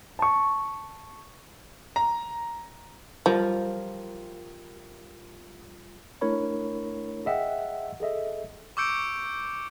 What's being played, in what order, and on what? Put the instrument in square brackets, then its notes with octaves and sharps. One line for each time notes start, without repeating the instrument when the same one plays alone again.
[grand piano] A5 C#6
A#5
[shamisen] F3 [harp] G3 F4 A#4
[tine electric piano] A3 D4 E4 A#4 C#5 B5
G#4 D#5 E5 F#5 G5
G#4 A4 D#5 E5
[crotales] C#6 D6 E6 G6 C#7 D7